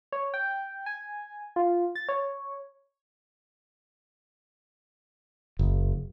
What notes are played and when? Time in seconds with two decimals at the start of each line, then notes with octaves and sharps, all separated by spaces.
0.12 C#5
0.34 G5
0.86 G#5
1.56 F4
1.96 A6
2.09 C#5
5.59 F#1